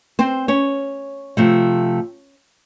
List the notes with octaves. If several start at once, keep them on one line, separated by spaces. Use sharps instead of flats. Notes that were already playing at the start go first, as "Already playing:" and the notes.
C4 C5
C#4 C#5
C3 F3 A3